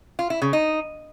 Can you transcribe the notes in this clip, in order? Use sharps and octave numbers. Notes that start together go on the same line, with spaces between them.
F4
E4
C#3
D#4